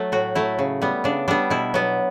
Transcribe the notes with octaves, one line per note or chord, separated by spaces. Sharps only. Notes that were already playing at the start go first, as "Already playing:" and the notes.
Already playing: F#3 A3
A2 F#4
F#3 A3 E4
C#3
G3 B3
C#3 D4
G3 B3 D4
B2 E4
F#3 B3